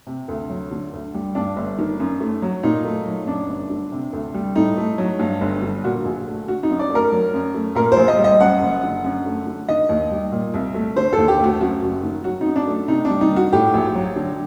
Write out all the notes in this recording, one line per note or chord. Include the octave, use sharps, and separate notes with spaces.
C3
D2
F#3
D3
D2
G3
G2 D4
G1
D#3
F#2
A3
F#3
A#2 D#4
A3
F#3
F#2 D4
G1
D3
C3
D2
G3
A2 D#4
A3
F#3
G2
G1
D3
A#2 F#4
A#1
A3
D3 F#4
D#4
F#2
D5
A3
A#4
F#3
F#2
A3
A#2 A#4
A#1 C5
D#5
G3
D#5
F#2 F#5
F#1
D3
F#2
A3
D3
D#3 D#5
D#2
G3
A#2
C2
A3
D3 C5
D#2 A4
G4
A3 F#4
F#2 F#4
F#1
D#3
F#3 F#4
F#2 D#4
D4
A3
C3 D#4
D4
G3
D#4
D#3
F#4
A2 G4
A#1
F#3
D3